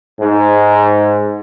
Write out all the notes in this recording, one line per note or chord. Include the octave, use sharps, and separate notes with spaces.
G#2